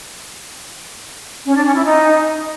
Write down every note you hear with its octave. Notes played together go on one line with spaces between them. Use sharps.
C#4
D4
C#4
E4
D#4